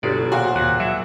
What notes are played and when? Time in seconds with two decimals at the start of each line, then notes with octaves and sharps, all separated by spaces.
0.03 G1 B2 F#3 G#3 D5
0.32 G#1 A#2 F#4 F5 G5
0.55 D#2 F#5
0.80 F#3 E5